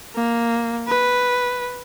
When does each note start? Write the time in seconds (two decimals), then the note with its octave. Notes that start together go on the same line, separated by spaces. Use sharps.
0.15 A#3
0.88 B4